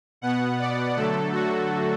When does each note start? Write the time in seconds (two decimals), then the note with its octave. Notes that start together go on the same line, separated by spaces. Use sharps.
0.21 B2 B3 F#5
0.59 D5
0.96 D3 F#3 A3 A4
1.33 F#4